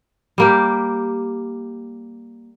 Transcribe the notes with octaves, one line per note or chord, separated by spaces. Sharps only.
G3 A#3 G4